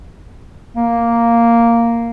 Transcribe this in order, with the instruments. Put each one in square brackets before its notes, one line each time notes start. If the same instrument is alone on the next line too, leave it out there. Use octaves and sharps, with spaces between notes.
[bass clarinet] A#3